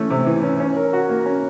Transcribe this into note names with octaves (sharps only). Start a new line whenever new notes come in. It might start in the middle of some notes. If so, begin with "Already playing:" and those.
Already playing: E3 A3 C#4
C3
E3
C#4
C#4
A#4
F#4
A#3
C#4